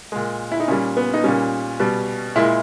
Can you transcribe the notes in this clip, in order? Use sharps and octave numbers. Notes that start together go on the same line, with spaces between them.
A#2 G#3
E4
D#4
A#2 G3 C#4
B3
D#4
A#2 G3 C#4
B2 G3
A#2 G#3 E4